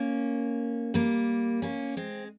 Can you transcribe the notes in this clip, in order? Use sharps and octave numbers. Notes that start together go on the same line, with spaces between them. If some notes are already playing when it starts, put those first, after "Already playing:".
Already playing: A#3 C#4
G3 A#3
A#3 C#4
G#3 C4